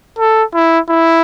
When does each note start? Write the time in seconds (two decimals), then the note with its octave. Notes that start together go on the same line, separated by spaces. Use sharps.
0.19 A4
0.54 E4
0.90 E4